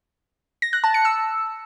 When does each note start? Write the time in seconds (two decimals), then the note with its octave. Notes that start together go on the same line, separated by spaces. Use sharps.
0.62 A#6
0.73 F#6
0.84 A5
0.94 C#7
1.05 E6